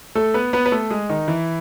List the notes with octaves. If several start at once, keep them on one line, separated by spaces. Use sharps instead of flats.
A3 A4
B3 B4
B3 B4
B4
A3 A4
G#3 G#4
D#3 D#4
E3 E4